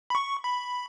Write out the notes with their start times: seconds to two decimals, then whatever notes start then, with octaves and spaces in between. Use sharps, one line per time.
0.10 B5
0.15 C#6
0.44 B5